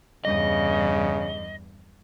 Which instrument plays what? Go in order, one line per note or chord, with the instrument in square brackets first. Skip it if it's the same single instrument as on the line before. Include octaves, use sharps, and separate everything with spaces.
[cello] E2 G2 [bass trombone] C#3 [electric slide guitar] D#5